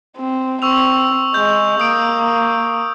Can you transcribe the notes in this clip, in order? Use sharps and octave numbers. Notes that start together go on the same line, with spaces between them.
C4
C4 C#6 E6 F7
G#3 G6
A#3 D#6 D7